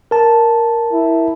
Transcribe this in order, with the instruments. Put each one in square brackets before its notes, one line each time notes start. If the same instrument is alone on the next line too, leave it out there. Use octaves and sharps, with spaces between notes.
[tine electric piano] A#4 A5
[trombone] E4